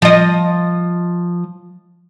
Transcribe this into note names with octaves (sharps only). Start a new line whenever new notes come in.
F3 D#5